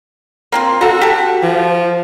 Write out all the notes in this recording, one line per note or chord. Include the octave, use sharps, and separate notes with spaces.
A#3 C4 F4
F#4 A4 A#5
G4 A4
F3